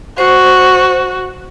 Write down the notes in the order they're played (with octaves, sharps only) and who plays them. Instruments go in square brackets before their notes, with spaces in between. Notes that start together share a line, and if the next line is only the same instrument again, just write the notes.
[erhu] F#4 [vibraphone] C5